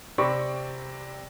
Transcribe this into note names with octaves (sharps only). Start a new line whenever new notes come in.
C3 C4 D5 B5 C#6